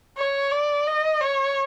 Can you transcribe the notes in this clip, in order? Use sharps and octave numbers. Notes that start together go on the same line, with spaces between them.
C#5
D5
D#5
C#5